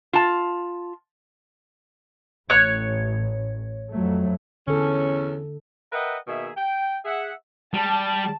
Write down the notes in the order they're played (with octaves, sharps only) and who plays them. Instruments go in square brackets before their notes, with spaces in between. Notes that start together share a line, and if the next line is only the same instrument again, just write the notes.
[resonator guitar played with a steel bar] F4 A5
[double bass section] A1 [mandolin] C#5 F#6
[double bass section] F2 F#3 A3
[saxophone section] E2 C#4 [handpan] D3 A4
[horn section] A#4 B4 D#5 E5 F#5 G5
B2 D#3 A#3 G#4 E5
G5
G#4 E5 F#5
[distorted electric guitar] G3 [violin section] A5